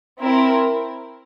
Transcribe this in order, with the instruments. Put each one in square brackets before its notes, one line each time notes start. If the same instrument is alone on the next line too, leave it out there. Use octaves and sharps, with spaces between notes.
[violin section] C4 E4 A#4